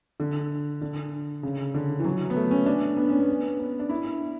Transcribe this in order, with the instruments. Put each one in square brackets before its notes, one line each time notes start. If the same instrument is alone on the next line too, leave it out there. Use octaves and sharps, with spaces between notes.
[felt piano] D3
D3
C#3
D3
E3
F#3
B3
A3
C#4
D4
B3
C#4
B3
B3
D4
E4